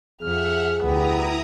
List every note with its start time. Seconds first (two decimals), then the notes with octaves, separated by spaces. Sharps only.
0.22 F2 G#4 E5 F#5 F6
0.83 D2 B3 E4 G4 A#5 D#6